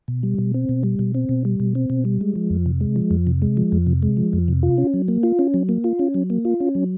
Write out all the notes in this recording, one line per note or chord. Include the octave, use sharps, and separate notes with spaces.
B2
G3
B2
C4
B2
G3
B2
C4
B2
G3
B2
C4
B2
G3
G#3
F3
F2
C3
G#3
F3
F2
C3
G#3
F3
F2
C3
G#3
F3
F2
C3
F4
C#4
F#3
A#3
F4
C#4
F#3
A#3
F4
C#4
F#3
A#3
F4
C#4
F#3